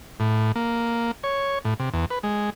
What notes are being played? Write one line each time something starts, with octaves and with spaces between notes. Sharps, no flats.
A2
A#3
C#5
A2
C3
E2
B4
G#3